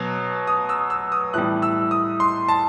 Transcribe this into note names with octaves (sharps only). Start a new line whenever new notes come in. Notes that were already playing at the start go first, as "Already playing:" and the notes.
Already playing: B2 F#3
D#6
E6
E6
D#6
A2 E3 G3 F#6
E6
D#6
C6
A5